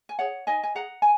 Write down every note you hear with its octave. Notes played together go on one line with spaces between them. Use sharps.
G#5
G#4 C#5 F#5
D#4 D#5 G#5
G#5
G#4 F#5 A#5
G#5